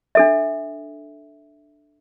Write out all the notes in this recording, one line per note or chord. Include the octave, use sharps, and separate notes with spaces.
D4 A4 E5